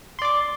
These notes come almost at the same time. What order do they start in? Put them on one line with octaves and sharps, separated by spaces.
C6 D5 D6